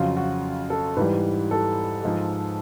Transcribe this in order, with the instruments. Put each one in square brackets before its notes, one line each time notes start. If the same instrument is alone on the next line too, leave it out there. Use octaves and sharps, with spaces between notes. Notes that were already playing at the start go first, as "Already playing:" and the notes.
Already playing: [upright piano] F2 C#3 F#3 F4
F#4
A4
G#2 E3 G3 B4
A4
G#2 F3 G#3